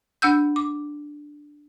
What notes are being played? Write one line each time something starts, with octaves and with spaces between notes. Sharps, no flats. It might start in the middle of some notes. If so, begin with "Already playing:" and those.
D4 F#5 E6 G6
D6